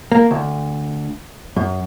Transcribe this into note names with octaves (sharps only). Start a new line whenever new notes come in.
A#3
D2
F#2